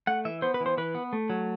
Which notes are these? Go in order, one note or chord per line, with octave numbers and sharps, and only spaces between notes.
A3 F#5
E3 E5
B3 C5
B4
E3
C5
E3 B4
B3
A3
F#3